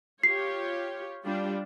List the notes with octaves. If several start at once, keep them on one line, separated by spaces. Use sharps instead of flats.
F4 G4 C#5 C7
G3 D4 F4